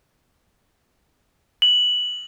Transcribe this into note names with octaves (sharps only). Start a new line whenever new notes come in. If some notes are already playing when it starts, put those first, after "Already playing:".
F#7